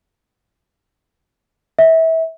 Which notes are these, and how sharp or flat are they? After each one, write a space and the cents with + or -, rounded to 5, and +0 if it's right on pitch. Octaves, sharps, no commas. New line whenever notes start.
E5 -25